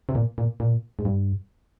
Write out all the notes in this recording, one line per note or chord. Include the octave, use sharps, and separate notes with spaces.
C3
A#2
A#2
A#2
G#2
G2